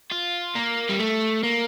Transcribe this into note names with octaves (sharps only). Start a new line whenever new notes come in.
F4
A#3
G3
A3
A#3